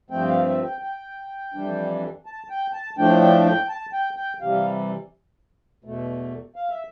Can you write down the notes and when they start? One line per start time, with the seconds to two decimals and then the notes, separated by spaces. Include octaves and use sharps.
0.10 G2 F3 A3 C4 G5
0.29 F5
0.46 E5
0.65 G5
0.82 G5
1.54 F2 E3 G3 D4
2.26 A5
2.50 G5
2.73 A5
2.98 A2 F3 A3 D4 G5
3.21 G5
3.45 G5
3.69 A5
3.93 G5
4.17 G5
4.41 C3 E3 G3 F5
5.84 E2 B2 A3
6.56 F5
6.70 E5